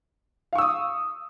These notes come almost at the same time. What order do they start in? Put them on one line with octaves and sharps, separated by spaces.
F5 C#6 E6 D#6